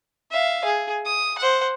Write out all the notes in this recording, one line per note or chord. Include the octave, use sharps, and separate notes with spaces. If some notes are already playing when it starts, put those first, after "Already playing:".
E5 F5
G#4
D#6
C5 F#5